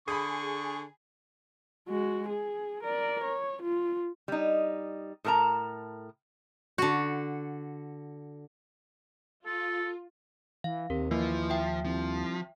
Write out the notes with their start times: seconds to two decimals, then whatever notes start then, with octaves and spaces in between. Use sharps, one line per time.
0.08 D3 G#4 B5 C#6 D#6
1.88 G#3 F#4
2.29 G#4
2.83 A#4 D5
3.24 C#5
3.62 F4
4.28 G3 D#4
5.24 A2 A4 A#4 A5 A#5
6.78 D3 F#4
9.46 F4 A4
10.64 E3 F5
10.90 D#2 C3 A#4
11.11 E3 F3 A#3
11.50 E5 G5
11.85 C2 F3